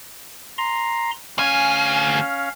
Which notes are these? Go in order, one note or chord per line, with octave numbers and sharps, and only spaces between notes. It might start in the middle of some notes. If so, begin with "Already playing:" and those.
A#5 C6
D2 C#4 F5 G#5